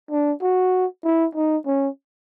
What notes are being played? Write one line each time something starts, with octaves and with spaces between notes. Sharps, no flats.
D4
F#4
E4
D#4
C#4